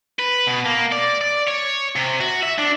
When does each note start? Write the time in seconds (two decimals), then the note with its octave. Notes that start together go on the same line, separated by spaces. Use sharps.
0.19 B4
0.47 B2
0.66 A#3
0.92 D5
1.21 D5
1.47 C#5
1.96 C3
2.20 F#4
2.43 E5
2.58 D4